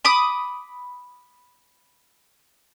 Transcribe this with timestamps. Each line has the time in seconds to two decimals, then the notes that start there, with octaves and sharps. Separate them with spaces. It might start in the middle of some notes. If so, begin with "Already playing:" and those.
0.05 B5 D6 D#6